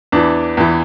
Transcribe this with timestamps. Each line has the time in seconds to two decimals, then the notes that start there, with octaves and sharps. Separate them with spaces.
0.12 E2 E3 D4
0.57 E2 E3